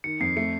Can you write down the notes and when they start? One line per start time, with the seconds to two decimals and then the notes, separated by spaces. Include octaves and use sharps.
0.04 D#3 C#7
0.20 F2 C7
0.37 A3 C#7